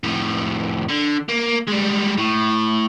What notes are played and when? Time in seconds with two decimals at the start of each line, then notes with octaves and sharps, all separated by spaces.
0.04 F2 A2
0.89 D3
1.29 A#3
1.68 G3 G#3
2.17 A2